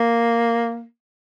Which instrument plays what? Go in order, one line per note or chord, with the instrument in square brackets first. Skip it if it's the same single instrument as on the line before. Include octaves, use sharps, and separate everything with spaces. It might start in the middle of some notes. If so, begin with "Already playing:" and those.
Already playing: [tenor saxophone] A#3